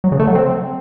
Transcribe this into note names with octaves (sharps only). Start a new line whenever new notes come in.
F#3
C#3
A3
F#3
C4